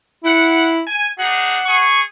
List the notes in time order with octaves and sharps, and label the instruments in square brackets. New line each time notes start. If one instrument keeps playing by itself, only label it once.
[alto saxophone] E4 [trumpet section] F#5
[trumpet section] G#5
[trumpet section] D4 D#4 G#4 [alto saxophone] F#5
[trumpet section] G#4 C#6